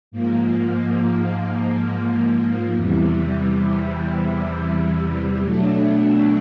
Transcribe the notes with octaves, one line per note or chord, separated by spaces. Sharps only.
G#2 F3 A#3
E2 C3 E3 G3
B2 F#3 A3 D4